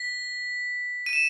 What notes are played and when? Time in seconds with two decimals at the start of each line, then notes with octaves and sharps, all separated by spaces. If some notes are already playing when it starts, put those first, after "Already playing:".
Already playing: B6
1.06 D#7
1.13 E7